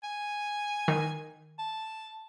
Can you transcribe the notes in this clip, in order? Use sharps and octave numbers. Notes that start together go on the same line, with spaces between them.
G#5
D#3
A5